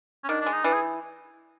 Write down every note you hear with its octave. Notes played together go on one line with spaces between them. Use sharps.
C#4
D#3 D4
D4
G#3
D#4
E3 D4
G#4